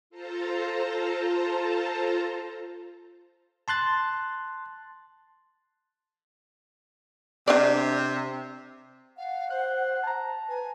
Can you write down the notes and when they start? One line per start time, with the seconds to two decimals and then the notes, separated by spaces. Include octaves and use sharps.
0.10 F4 A4 C5 A5 A#5
3.68 A5 C6 F#6 A6
7.48 C3 D4 D5
9.17 F5 F#5
9.50 C5 F#6
10.03 A5 A#5
10.49 B4 G#5